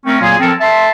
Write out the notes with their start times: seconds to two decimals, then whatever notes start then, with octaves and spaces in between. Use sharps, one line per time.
0.06 A3 C4 C#4 A#4
0.21 A#2 F#3 A#3 F4 G#4
0.40 F3 C4 A4 A#4
0.61 E5 A5 C6